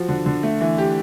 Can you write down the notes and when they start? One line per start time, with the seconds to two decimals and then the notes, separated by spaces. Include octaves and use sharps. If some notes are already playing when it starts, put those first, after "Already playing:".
Already playing: F3 F#4
0.09 D3
0.26 D3
0.43 A3
0.61 E3
0.78 G4